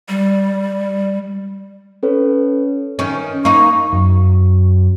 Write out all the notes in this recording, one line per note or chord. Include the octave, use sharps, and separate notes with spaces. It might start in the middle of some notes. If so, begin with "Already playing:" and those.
G3
C#4 A4 B4 C#5
D#3 C#4
A#3 D#4 C#6
F#2